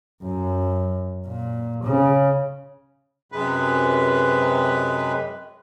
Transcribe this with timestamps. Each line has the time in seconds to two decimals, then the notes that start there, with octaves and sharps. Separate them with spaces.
0.23 F#2
1.27 A#2
1.85 C#3
3.32 F#2 C3 G#3 B4